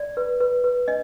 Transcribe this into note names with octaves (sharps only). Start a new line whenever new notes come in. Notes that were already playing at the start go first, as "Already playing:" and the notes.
Already playing: D5
B4
B4
B4
D4 D#5